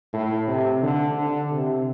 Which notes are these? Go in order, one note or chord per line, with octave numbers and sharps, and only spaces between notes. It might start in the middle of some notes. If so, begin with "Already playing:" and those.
A2
C3
D3
D3
C3